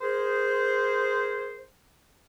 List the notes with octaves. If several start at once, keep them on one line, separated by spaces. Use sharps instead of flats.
G#4 A#4 C5